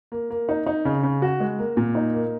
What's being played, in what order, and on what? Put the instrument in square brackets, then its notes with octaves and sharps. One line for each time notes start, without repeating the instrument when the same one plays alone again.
[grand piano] A#3
A#3
D#4
D#4
C#3
C#3
F#4
G#3
A#3
A#2
D#4
A#3